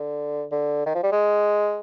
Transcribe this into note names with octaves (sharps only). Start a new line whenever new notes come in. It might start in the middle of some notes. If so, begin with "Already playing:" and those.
Already playing: D3
D3
D#3
F3
G3
G#3